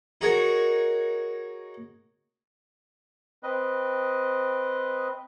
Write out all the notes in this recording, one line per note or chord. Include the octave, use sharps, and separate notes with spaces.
D#4 F#4 G#4 A#4 C#5
C4 B4 D#5